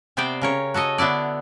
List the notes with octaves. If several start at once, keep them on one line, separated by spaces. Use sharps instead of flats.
C3 B3 C5 D5 G5
C#3 A#4 C#5
F#4 A4 C#5 D#5
D3 B3 D4 E4 D5